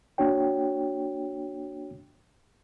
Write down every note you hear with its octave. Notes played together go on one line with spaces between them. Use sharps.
A#3 D4 F#4 C#5 G5